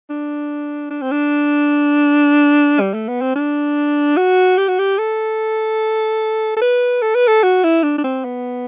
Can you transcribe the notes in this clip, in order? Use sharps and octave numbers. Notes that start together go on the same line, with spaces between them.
D4
D4
C4
D4
G3
A3
B3
C4
D4
F#4
G4
F#4
G4
A4
A4
B4
A4
B4
A4
F#4
E4
D4
D4
C4
B3